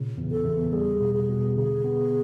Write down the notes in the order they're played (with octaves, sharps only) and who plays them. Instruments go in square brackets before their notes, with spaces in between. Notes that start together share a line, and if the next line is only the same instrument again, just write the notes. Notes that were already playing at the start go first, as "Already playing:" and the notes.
Already playing: [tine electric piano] A#2 C#3
E2
[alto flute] A4
[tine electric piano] E2
[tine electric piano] G3 [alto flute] G#4
[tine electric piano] B2
[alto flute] G#4
[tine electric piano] B2
[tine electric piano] D3 [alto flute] G#4
[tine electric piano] B3